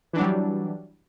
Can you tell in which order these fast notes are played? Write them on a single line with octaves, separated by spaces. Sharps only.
E3 D4 F#3 G3